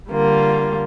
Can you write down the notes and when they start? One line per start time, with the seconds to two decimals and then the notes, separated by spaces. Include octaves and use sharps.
0.10 D3 G3 A#3 F4